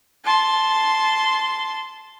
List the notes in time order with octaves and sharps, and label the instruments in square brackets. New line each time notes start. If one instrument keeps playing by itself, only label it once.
[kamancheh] A5 C6